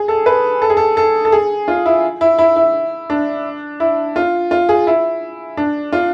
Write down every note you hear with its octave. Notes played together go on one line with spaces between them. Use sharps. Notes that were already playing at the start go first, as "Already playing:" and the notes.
Already playing: G#4
A4
B4
A4
G#4
A4
A4
A4
G#4
F4
E4
E4
E4
E4
D4
E4
F4
F4
G#4
E4
D4
F4